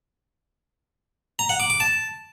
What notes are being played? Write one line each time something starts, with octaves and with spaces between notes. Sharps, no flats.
A#5
F#5
D6
D6
A5